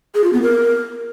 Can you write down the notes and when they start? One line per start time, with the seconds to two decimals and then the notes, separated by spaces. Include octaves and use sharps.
0.15 G#4
0.24 F4
0.33 B3
0.42 A#4